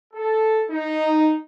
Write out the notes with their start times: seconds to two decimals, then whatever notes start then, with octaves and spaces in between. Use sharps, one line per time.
0.14 A4
0.70 D#4